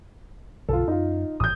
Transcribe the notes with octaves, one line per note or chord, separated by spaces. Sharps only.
B1 F2 D3 F4 A4
F#2 D#4 F4
G#1 A2 E3 D#6 G6